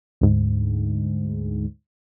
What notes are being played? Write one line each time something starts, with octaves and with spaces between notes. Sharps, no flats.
D2 G#2